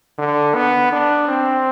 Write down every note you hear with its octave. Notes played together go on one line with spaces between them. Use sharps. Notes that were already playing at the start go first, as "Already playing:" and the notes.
D3
B3
D4
C4